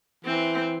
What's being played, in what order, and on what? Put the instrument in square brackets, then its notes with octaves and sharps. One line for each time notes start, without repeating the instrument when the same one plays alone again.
[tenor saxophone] E3 [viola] C4